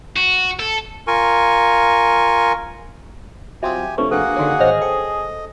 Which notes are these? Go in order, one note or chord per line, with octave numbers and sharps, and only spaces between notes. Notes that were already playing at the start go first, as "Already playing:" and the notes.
F#4
A4
F4 A#4 G#5 C#6
F#3 C4 F4 G4 E5 G#5 C6 D#6
C3 F3 A3 D4 B4 C#5 C#6
A#3 D4 F#4 G#4 A4 B4 F#5
D3 D#3 C#4 A#4 C6
G#1 C5 C#5 D#5 F6 A#6
A4 D#5 G5